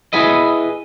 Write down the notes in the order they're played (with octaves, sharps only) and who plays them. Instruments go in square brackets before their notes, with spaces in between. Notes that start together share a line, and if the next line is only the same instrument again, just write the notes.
[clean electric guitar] E4 G#4 B4 D#5